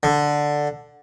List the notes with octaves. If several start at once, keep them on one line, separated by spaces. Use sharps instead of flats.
D3